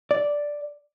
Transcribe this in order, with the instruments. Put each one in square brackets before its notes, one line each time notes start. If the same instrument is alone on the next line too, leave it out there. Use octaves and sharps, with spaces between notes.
[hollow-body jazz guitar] D5